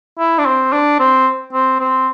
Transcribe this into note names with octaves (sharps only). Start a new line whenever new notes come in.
E4
D4
C4
D4
C4
C4
C4